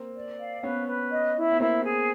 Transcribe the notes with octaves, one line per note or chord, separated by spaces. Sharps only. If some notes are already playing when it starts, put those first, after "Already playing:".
Already playing: A#3 C4
D5
F5
B3 C#4 B4
B4
D#5
E4
B3
A#3 C4 E4
G#4